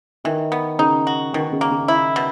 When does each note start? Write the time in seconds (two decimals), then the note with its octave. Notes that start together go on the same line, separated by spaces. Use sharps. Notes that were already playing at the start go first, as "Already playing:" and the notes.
0.24 D#3 E3
0.52 B3
0.79 C#3 D#4
1.07 F#4
1.33 B2 D#3
1.52 C#3
1.61 A#3
1.71 C#3
1.88 E4
2.16 B2